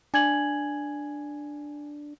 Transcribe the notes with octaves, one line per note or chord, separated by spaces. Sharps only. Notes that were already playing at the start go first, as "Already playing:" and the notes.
D4 G#5 G#6 F#7